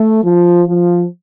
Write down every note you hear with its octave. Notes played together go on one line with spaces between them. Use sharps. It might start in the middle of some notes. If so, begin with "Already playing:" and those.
Already playing: A3
F3
F3